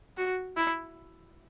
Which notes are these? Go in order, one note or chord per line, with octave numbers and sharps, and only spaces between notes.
F#4
E4